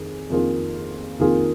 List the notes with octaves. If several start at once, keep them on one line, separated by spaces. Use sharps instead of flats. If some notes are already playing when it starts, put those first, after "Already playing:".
Already playing: F2 D#3 G#4
F2 D#3 A#3 F4 G#4
F2 D#3 A#3 F4 G#4